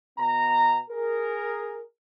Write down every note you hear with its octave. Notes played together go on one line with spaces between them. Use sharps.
B2 B3 A#5
G#4 A#4